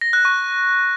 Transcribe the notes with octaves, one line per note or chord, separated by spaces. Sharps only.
A#6
F#6
C#6